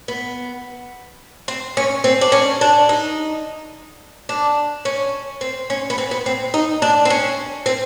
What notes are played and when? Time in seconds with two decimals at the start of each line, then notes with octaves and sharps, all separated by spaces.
0.08 B3
1.48 C4
1.77 C#4
2.04 C4
2.21 D4
2.32 C#4
2.61 D4
2.89 D#4
4.29 D4
4.85 C#4
5.41 C4
5.70 C#4
5.90 B3
5.98 C4
6.11 B3
6.26 C4
6.54 D#4
6.82 D4
7.05 C4
7.10 C#4
7.66 C4